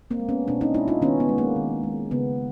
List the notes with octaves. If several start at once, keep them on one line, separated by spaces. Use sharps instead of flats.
A#3 C4
G#3
B3 C#4
B2 C4 D4
C#4 D#4
G#3 D4 E4
D#4 F4
D#3 B3 C#4
B3
G#3
A#3
D#3
G#3
C#3 B3